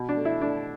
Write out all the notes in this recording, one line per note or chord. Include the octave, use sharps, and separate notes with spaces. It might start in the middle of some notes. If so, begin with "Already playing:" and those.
Already playing: B2
D4
A3
E4
A3 D4